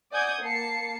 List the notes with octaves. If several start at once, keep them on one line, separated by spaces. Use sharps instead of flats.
D5 F#5 G#5 D#6 G6 G#6
A#3 A5 C7 C#7